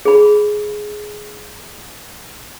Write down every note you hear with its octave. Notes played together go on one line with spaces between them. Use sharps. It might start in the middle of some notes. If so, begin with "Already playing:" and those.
G#4 B5